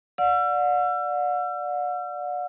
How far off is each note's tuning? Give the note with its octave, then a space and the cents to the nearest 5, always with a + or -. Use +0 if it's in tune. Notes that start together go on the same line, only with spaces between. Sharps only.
D5 +0 F#5 -40 E6 +40